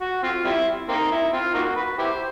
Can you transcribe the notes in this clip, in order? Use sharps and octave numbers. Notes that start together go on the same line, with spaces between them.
F#4
C4 F4
G3 C4 E4
A#3 C4 D#4
E4
C4 F4
A#3 D#4 F#4
B4
E4 G4 C5